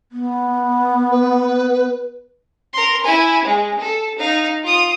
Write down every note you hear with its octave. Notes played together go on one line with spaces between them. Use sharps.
B3
B4
A#4 C6
E4 G#5
G#3
A4
D#4 F5
F4 D#6